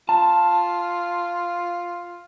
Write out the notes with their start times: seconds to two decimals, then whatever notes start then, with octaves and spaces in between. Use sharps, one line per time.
0.09 F4 A5